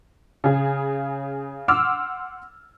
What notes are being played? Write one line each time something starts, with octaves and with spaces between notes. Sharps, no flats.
C#3 G#4
F#5 C6 D6 E6 F6